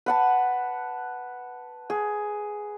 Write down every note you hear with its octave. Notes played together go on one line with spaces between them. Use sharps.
B4 F#5 A5
G#4